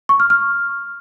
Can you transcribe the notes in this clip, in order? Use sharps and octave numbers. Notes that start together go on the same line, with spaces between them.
C#6
F6
F6